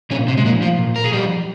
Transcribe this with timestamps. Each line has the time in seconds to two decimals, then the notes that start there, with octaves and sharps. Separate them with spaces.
0.10 A#2 C#3 C#4
0.28 C3 C4
0.37 G#3
0.45 A#2 F3 A#3
0.62 F3 F4
0.79 A#2
0.96 A#4
1.04 G#4
1.13 F3 G3 G4